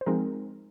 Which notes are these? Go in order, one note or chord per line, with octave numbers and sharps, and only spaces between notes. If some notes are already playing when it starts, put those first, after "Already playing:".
C5
F3 G#3 C4 D#4 A#4